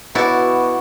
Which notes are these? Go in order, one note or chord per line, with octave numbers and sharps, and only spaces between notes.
B2 E4 F#4 D5